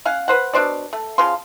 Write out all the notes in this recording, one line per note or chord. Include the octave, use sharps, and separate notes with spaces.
C#4 F5 F#5
B4 C5 F#5
B2 D4 C5 D5
A3
C#3 F3 F5 C6